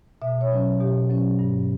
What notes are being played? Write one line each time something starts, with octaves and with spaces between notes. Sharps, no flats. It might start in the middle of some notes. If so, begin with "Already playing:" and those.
B2 E5
C#5
F#3 C#4
B2 G4
F#3 C#4
G2